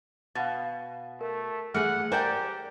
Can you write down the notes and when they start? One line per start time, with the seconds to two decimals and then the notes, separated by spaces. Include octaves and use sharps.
0.35 B2 F5 F#5 A6
1.21 A3 A#4
1.74 E3 A3 G#4 F#5 F6
2.12 G4 A#4 C5 D5 G5 G#5 G6